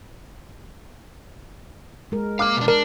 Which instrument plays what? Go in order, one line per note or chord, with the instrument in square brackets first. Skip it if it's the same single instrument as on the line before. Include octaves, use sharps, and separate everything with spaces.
[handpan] G#3 A#4
[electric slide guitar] A#3 F5 [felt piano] D6 F6
[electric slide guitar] B2 D4
[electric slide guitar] D4 [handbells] A#4